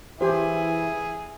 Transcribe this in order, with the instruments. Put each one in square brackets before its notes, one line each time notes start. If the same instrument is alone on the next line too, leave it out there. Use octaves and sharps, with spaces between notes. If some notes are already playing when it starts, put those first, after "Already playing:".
[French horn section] E3 [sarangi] E4 [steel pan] G4 C5 [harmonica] G#4